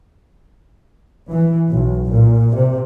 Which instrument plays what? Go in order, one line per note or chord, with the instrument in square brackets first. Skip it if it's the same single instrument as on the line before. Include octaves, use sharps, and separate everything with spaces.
[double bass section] E3
B1
A#2
C3